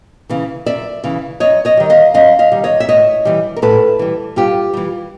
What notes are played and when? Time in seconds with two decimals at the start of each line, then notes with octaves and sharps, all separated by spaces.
0.29 C#3 E3
0.66 F#2 D5 E5
1.04 C#3 E3
1.40 F#2 C#5 D#5
1.65 C#5 D#5
1.77 D#3 G3
1.90 D#5 F5
2.14 F#2 D#5 F5
2.39 D#5 F5
2.52 D#3 G3
2.64 C#5 D#5
2.80 E5
2.89 A2 C#5 D#5
3.25 E3 G3
3.56 A#4
3.62 A2 A4 B4
3.99 E3 G3
4.36 G2 F4 G4
4.73 E3 G3